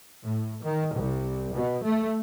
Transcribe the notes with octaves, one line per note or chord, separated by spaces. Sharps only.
A2
D#3
C2
B2
A3